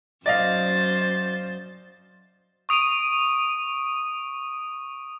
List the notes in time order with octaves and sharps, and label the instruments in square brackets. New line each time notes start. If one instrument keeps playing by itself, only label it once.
[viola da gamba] F#2 C5 [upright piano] D5 D#5 F5 [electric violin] A6
[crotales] C#6 D#6 D7 D#7 F7